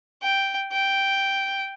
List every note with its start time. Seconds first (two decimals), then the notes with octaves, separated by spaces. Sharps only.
0.22 G5
0.72 G5